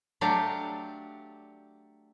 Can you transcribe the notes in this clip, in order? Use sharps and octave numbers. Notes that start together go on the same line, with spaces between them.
F#3 A3 D4 G4 F5